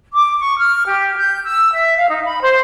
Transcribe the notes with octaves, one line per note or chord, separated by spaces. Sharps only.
D6
C#6
F6
G4
G6
E6
E5
F5
D#4
B5
C5